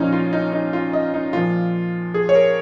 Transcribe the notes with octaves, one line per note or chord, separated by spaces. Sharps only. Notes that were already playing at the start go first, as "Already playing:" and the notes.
Already playing: A#2 F3 C#4 D#4
F4
D#4
D#4
F4
D#5
D#4
A#2 F3 F4
G#4
C#5
A#4